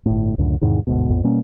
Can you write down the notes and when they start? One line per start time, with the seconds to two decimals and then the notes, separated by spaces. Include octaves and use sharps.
0.06 G1 A2
0.38 C#2 F#2 A2 D3
0.62 E2 G#2 C3 D#3
0.87 G1 D2 G#2 B2
1.10 A#1 F2 A2 B3
1.23 B2 G3 A#3 C#4